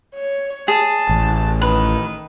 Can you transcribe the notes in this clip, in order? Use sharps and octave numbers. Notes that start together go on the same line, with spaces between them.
C#5
G#4 A5
A1
D#3 B4